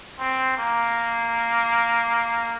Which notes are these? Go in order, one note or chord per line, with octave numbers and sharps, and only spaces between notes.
C4
A#3